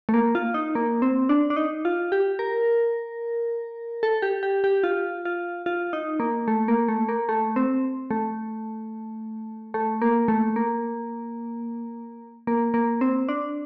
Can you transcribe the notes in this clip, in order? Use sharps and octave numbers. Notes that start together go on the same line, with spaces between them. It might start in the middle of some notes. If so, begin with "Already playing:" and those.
A3
A#3
F4
D#4
A#3
C4
D4
D4
D#4
F4
G4
A#4
A4
G4
G4
G4
F4
F4
F4
D#4
A#3
A3
A#3
A3
A#3
A3
C4
A3
A3
A#3
A3
A#3
A#3
A#3
C4
D4